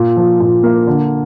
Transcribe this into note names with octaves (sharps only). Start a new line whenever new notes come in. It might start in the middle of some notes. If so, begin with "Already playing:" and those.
Already playing: A#2
F3
A#2
A#3
D3